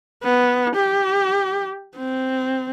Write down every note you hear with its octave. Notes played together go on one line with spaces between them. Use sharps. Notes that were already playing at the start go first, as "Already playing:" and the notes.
B3
G4
C4